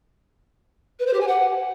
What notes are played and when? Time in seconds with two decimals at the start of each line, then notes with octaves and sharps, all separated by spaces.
0.99 B4
1.06 C5
1.13 G4
1.20 G#5
1.27 F#5